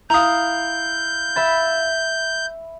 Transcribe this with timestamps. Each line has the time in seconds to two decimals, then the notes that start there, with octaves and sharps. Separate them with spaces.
0.10 E4 F5 A#5 D#6 G6
1.36 E5 B5 A6